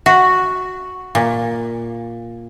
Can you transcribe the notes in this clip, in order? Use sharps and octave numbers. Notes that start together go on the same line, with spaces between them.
F#4
A#2